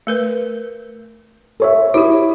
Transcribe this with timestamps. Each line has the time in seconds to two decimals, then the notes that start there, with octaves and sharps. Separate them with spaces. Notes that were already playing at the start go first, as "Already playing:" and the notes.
0.07 A3 A#4 B4
1.60 A4 C#5 E5
1.94 E4 F#4 G4 C#5